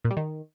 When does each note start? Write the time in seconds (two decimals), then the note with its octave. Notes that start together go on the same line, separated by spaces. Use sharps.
0.04 A#2
0.11 G3
0.17 D#3